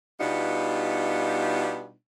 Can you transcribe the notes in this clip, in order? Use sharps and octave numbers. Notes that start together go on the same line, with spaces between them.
B2 G3 B3 D4 D#4 F4